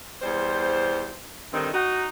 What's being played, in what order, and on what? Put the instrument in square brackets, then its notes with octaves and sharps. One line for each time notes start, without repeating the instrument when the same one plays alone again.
[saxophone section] E2 G3 C5
G2 D3 D#3 C4 D#4
D#4 F#4